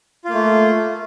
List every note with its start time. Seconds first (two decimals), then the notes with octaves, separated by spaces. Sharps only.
0.25 F4
0.29 A#3
0.34 A3